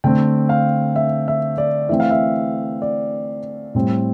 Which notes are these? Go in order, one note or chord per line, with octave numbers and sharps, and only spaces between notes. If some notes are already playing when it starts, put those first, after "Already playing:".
D3 A3 C4 G5
F5
E5
E5
D5
E3 A3 C4 E5
F5
E5
D5
A2 G3 C4